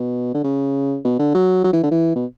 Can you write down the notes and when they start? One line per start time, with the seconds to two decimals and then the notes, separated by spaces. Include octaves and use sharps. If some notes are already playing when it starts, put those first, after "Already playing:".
Already playing: B2
0.34 D3
0.44 C#3
1.05 B2
1.19 D3
1.34 F#3
1.64 F#3
1.73 E3
1.83 D3
1.91 E3
2.15 B2